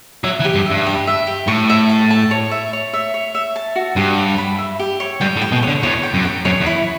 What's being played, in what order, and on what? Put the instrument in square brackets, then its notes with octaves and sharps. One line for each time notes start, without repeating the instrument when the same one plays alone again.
[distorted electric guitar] F#3 [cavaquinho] E5
[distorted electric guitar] E3
[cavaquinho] G4
[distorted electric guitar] G2
[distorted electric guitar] G2 [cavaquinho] E5
[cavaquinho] G4
E5
G4
[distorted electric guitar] A2 [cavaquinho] C#6
[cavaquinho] E5
A5
A5
C#5
E5
C#5
E5
C#5
E5
A5
F#4
[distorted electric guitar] G2 [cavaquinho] G4
[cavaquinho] C#5
B5
E5
G4
C#5
[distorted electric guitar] G2 [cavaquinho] G5
[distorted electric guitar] A2
[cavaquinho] G5
[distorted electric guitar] B2
[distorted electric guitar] D3 [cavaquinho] C#5
[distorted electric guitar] E2 [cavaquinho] C#5
[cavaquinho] G5
[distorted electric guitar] F#2
[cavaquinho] G5
[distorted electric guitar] F#2 [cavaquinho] C#5
[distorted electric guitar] E2
[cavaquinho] E4